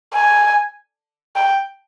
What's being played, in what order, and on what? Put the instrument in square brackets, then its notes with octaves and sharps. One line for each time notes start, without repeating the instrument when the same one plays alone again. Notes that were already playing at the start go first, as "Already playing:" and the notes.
[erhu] G#5
G5